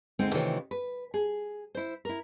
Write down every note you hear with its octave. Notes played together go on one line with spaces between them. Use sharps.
D2 G#3 C4 D#4
C3 D#3 E3 A3 F4 C#5
B4
G#4
E4 C5
E4 A#4